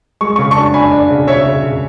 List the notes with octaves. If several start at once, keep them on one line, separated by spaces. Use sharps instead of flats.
G#3 C#6
C#3 C#6
D4 A5 C#6
D4 G#5 B5
D4
C#3
C#3 C#5 E5
C#3
C#3